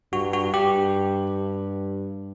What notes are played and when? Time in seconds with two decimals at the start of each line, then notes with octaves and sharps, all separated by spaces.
0.12 G2 F#4
0.33 F#4
0.53 G2 G4